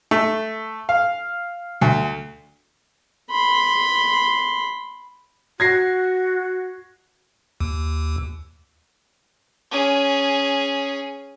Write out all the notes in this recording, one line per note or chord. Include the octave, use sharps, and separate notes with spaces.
A3
F5
D2
B5 C6
F#4 G#6 A#6 C7
D#2
C#4 G#4